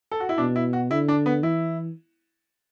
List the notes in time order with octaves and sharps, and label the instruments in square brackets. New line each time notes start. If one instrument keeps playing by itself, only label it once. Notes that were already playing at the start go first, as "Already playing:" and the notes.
[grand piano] A4
F#4
E4
[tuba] B2 [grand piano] D4
[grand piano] E4
F#4
[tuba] D3 [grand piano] E4
[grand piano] D4
B3
[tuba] E3 [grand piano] E4